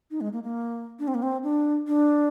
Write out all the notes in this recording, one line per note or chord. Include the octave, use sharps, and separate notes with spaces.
D#4
G#3
A#3
A#3
D4
C4
A#3
C4
D4
D4